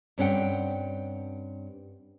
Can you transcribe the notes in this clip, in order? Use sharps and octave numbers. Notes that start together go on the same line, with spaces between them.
G2 C4 C#4 D#4 F#5 G5